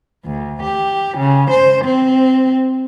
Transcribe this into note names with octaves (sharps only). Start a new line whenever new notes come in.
D2
G4
C#3
C5
C4